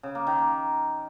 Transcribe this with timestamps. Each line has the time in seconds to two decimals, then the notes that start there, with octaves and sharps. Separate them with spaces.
0.03 C#3
0.15 A#3
0.27 D#3
0.38 A#3